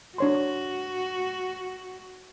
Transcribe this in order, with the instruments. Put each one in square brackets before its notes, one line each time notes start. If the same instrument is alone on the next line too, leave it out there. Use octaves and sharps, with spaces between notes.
[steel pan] D4 C#5 C6 [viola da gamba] F#4